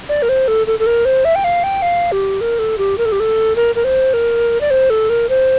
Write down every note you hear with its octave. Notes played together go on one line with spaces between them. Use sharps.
D5
A#4
C5
A4
A4
A4
A#4
C5
E5
G5
F5
G5
F5
G4
A#4
A4
G4
A#4
A4
G4
A4
A#4
A#4
C5
A#4
D5
C5
A4
A#4
C5